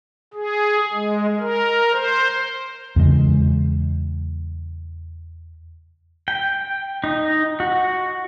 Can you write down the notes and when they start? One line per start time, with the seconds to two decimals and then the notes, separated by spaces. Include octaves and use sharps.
0.33 G#4
0.93 G#3
1.40 A#4
1.92 C5
2.96 E2 C#3 G#3
6.28 G5
7.04 D#4
7.60 F#4